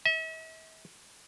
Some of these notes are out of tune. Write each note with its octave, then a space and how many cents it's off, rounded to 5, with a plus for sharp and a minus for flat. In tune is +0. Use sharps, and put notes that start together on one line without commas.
E5 -45